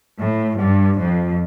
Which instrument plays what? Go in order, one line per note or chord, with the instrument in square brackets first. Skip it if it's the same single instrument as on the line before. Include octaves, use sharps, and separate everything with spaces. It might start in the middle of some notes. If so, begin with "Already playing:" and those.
[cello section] A2
G2
F2